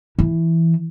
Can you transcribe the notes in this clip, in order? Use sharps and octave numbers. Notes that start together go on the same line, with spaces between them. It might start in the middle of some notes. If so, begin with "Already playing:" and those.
E3